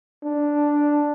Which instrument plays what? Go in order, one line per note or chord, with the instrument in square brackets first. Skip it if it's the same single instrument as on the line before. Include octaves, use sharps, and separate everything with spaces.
[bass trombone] D4